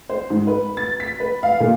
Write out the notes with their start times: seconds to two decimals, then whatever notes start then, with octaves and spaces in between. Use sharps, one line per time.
0.10 C5
0.30 G#2
0.47 B4
0.77 A6
1.00 B6
1.20 B4
1.43 F5
1.60 A#2